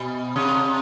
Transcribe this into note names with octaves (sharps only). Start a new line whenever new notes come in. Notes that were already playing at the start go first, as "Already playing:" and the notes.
Already playing: B2
C3